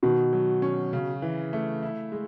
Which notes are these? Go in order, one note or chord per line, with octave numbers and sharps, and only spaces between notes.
B2 D#3
F#3
C#4
C#3
E3
A3
E4
G#3